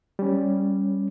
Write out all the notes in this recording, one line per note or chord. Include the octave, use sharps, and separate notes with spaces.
G3 C#4